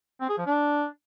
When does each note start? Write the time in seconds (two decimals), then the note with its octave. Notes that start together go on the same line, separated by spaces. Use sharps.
0.20 C4
0.29 G#4
0.38 F3
0.46 D4